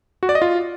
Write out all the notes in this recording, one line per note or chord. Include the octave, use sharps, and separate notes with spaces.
F#4
D5
D#5
F4